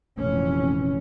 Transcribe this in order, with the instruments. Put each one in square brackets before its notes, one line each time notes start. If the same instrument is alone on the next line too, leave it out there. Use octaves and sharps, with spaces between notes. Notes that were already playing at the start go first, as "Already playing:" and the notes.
[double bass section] F1 A#2 E3 C#4